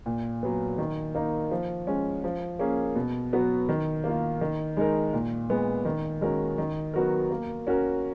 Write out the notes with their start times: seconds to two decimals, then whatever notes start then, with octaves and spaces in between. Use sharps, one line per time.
0.06 A#2
0.43 F#3 B3
0.78 D#3
1.15 A#3 D#4
1.51 F3
1.87 G#3 C#4
2.24 F3
2.59 A#3 C#4 G#4
2.96 B2
3.33 F#3 B3 F#4 B4
3.69 D#3
4.04 A#3 F4
4.41 D#3
4.77 G#3 D#4 A#4
5.13 A#2
5.50 G#3 B3
5.85 D#3
6.21 G#3 C#4 F#4 A#4
6.58 D#3
6.94 F#3 B3 F#4 A#4
7.31 A#3
7.67 C#4 F#4 A#4